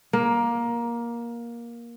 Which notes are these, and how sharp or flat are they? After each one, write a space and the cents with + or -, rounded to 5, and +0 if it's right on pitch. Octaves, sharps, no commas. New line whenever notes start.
A#3 +15